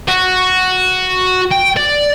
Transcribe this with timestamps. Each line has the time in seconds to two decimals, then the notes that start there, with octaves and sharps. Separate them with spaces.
0.08 F#4
1.52 G5
1.77 D5